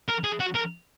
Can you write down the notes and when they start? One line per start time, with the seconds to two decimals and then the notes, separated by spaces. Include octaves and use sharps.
0.08 A#4
0.24 G#4
0.40 F#4
0.55 A#4